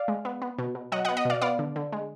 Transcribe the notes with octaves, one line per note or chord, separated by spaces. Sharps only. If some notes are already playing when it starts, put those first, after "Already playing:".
Already playing: D5 F5
G#3
B3
B3
B2
B2
F#3 D#5 F#5
D#5 F#5
B3
D#5 F#5
B2 D5 F5
B3 D5 F5
D3
D3
G#3